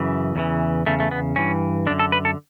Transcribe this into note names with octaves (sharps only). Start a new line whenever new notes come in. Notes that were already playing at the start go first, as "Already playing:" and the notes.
Already playing: F#2 C#3 E3
E2 C#3 E3
E2 C#3 A3
A3
B3
G2 E3 C#4
F#2 D3 D4
A4
B4
A4